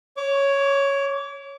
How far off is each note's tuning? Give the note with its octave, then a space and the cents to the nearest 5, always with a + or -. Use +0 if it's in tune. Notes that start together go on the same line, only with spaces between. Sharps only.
C#5 +0 D6 -35